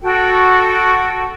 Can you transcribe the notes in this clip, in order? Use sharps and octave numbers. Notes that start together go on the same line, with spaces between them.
F#4 A4 G5